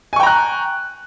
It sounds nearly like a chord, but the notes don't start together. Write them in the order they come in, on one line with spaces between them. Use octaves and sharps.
G#5 C#6 G5 A#5 F#6